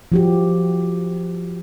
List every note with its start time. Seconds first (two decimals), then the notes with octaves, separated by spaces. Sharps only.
0.12 F3 F#4 G4